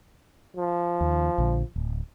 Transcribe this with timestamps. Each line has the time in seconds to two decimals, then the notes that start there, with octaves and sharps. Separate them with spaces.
0.56 F3
1.01 D#2
1.38 A#1 D3
1.76 D1